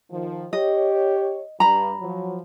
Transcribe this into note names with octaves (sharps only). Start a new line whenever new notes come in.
D#3 F3
G4 C#5 D#5
G2 A#5 B5
F3 F#3